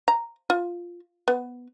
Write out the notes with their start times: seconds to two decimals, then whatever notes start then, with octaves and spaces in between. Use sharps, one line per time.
0.08 A#5
0.50 F4
1.28 B3